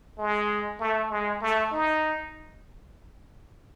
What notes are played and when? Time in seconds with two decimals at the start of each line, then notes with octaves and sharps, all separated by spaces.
0.18 G#3
0.80 A3
1.10 G#3
1.41 A3
1.72 D#4